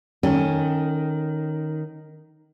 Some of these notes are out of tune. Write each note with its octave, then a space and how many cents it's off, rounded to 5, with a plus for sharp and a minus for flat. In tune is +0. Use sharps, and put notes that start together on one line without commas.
D#3 +0 C#4 -5 A4 +25